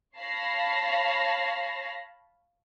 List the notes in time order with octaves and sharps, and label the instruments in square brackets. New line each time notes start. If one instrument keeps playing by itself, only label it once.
[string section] C#5 F5 A5 B5 A#6 C7